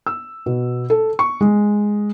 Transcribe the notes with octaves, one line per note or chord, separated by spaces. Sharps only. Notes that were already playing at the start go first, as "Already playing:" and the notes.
E6
B2
A4
C#6
G#3